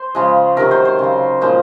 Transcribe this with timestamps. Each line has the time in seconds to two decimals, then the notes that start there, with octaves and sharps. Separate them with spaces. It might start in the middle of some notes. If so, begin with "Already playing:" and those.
Already playing: C5
0.15 C#3 F3 G#3
0.57 C3 D#3 F#3 A#4
0.71 C5
0.85 C5
0.99 C#3 F#3
1.41 A#2 F3 G#3 C5